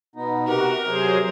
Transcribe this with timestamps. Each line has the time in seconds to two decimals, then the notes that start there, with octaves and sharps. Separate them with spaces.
0.15 B2 B3 D#4
0.47 C3 F#4 G4 A#4 F#5
0.86 C3 F#3 G#4 C5